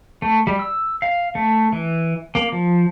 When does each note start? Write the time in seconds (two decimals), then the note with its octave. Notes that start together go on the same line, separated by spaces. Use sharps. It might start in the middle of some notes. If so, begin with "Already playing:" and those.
0.22 A3
0.47 G3
0.59 E6
1.02 F5
1.35 A3
1.72 E3
2.35 A#3
2.52 F3